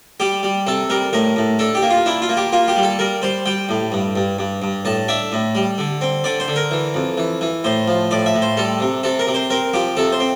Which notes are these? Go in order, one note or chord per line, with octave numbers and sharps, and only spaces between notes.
G3 G4
G3
C3 A4
G3 A#4
A2 A#4
A2
D4 A4
G4
A#3
F4
D4 E4
F4
A#3
G4
A#3 F4
G4
G3
A4
G3 A#4
G3 C5
G3 G5
A2
G2
G2
G2
G2
A2 A5
D4 E5
A2
G3
D3
C4
D3 D5
C5
D3
A#4
E3
F2
E3
E3
A2 C5
F3
A2 D5
E5
A2
C5
G3 A4
C3
C3 A4
A#4
C3
C5
C4 A#4
F3 G4
C3 A4
C5
C4